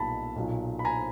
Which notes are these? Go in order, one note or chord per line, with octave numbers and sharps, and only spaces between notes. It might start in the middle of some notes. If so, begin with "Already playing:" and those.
Already playing: B1 A#2 G3 A5 B5
B1 A#2 F#3
B5
G#5 A#5